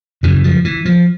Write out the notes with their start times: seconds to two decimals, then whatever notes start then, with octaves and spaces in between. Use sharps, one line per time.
0.23 F#2 C#3 E3
0.44 F3
0.65 E3
0.85 F3